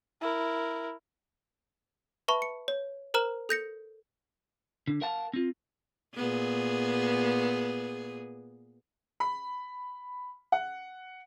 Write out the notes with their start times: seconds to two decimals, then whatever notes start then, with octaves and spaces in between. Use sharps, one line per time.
0.21 E4 A#4
2.28 B4 E5 A5 B5 C#6
2.42 C#7
2.68 C#5
3.14 A#4 C5 A#5 F6 E7
3.49 A4 G6 A#6 C#7
4.88 D3
5.01 A#4 F5 F#5 A5
5.33 C4 F4
6.16 A#2 B3 G#4
9.20 B5
10.52 F#5